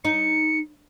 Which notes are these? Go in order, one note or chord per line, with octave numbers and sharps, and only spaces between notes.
D#4 C#7